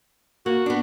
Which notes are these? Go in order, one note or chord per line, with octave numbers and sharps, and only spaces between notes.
A#3 F#4
B3 D4